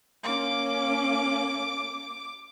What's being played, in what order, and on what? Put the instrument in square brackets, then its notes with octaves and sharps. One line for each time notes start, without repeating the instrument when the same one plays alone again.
[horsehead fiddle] A#3 C#4 [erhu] D6